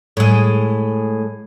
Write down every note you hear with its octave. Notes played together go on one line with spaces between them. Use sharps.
A2 G#3